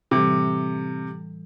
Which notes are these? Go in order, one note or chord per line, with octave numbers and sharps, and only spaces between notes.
A2 C3 E3 G3